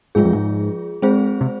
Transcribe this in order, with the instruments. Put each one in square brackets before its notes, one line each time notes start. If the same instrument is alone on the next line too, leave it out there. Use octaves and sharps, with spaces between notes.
[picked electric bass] G#2 [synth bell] F3 G#3 F4 G#4
[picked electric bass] F2
G#2
[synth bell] G#3 C4 G#4 C5
[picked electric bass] C3